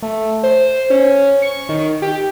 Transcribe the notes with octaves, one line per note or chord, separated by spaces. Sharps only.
A3
C5
C#4
C#6
D#3
G4